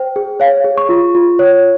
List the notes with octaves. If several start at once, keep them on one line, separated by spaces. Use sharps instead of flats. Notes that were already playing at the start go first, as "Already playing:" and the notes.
Already playing: C5 G5
G#4
C#5 F5
G#4
C#6
F4
F4
C#5